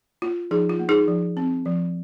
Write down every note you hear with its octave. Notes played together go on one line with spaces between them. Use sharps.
A#3 F4
F3 D#4 G#4
F4
A#3
D#4 G#4
F3
C4
F3